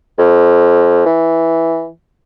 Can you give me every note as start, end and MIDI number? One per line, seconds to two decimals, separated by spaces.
0.18 1.01 41
1.06 1.88 52